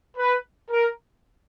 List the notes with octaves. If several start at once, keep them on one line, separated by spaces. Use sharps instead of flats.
B4
A#4